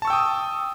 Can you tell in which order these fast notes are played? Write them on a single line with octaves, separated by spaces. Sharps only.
A5 C#6 E6 G5 D#6